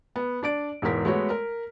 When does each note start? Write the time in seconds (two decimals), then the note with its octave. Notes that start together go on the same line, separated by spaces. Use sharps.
0.16 B3
0.43 D4 D5 D7
0.82 E1 G#2 E3 A#4 B6
1.05 G#3 A3 B3 F#4 C#5
1.30 A#4